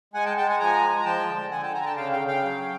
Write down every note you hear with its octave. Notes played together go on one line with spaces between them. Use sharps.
G#3 F#5 G#5
G5 A5
G#3 G5 A5
F#5 G#5
F3 G#5 A#5
G#3
A#5
F3 G5 A5
D3
D3 F#5 G#5
G5 A5
D3 G#5 A#5
G5 A5
C#3 F5 G5
F5 G5
C#3
F5 G5
F#3